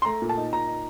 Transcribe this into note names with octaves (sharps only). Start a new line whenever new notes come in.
C6
A3 A#5
A#2
A5
D#4
A#2 A#5
D#4